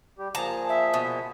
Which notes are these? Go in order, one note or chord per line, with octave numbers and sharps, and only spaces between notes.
G3 G4
A#2 F3 G#4 A5 A#5
E5
B2